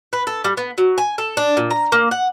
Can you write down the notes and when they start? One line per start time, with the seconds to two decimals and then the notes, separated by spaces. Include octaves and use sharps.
0.13 B4
0.27 A4
0.44 G3
0.57 B3
0.78 F#3
0.98 G#5
1.18 A4
1.37 D4
1.57 A#2
1.71 A#5
1.92 A#3
2.11 F#5